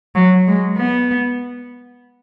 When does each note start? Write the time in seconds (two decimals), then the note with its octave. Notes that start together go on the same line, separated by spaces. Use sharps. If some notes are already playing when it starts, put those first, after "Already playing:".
0.15 F#3
0.47 G#3
0.77 B3